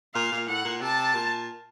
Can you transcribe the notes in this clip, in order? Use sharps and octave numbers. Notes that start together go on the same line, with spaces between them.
A#2 F5
A#2
A2 F#5
A#2
C3 A5
A#2